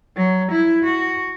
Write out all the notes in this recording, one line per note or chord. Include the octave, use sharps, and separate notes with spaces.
F#3
E4
F#4